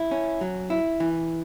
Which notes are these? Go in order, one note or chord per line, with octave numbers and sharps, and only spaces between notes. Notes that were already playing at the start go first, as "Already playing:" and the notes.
Already playing: E4
C#4
F#3
E4
E3